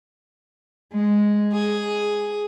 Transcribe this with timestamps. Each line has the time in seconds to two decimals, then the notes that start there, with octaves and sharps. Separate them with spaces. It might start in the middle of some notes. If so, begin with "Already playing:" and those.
0.91 G#3
1.54 G#4